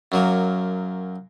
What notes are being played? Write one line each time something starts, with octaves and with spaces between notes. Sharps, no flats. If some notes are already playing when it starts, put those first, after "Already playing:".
F#2 F#3 A#3